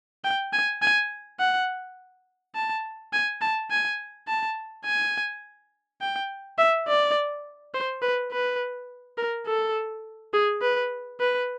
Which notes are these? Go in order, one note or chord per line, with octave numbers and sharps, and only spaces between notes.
G5
G#5
G#5
F#5
A5
G#5
A5
G#5
A5
G#5
G5
E5
D5
C5
B4
B4
A#4
A4
G#4
B4
B4